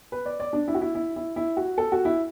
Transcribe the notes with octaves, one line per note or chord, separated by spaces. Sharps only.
B4
D5
D5
D4
E4
F#4
E4
E4
E4
E4
F#4
A4
F#4
E4